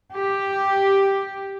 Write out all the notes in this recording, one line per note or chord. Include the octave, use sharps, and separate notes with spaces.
G4